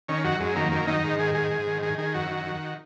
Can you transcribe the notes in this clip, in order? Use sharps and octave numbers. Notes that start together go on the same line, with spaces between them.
D#3 C#4
F#2 F#4
F#2 G#3
D#3 A#3
F#2 A#3
D#3 D#4
G#2
D#3 G#4
G#2 G#4
G#2
D#3
D#3 G#4
D#3 G#4
F#2 F#4
D#3
D#3